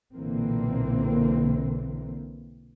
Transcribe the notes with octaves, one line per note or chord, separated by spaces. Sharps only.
B1 A#2 D3 E3 A#3 C4